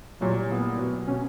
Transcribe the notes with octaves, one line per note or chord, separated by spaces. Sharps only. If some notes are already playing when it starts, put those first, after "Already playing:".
A#2 F#3 G3 A#3 E4
A#2 G3 A#3 B3 E4
B2 F#3 B3
B2 F#3 B3 C#4